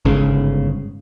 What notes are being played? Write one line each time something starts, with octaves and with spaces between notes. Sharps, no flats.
G1 G#2 C#3